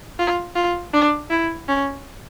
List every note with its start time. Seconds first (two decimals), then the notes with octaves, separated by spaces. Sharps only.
0.19 F4
0.55 F4
0.93 D4
1.30 E4
1.68 C#4